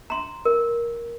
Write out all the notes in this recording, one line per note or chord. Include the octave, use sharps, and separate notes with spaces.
A#5 C6
A#4